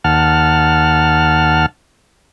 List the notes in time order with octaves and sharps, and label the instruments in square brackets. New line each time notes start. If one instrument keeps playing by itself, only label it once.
[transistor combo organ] D#2 F#5 A5 F6